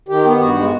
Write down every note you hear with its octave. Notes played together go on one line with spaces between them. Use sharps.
D#3 G4
B3
G2 F#4
G#3